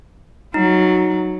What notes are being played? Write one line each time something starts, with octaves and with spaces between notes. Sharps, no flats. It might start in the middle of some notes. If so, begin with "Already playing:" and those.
F#3 D#4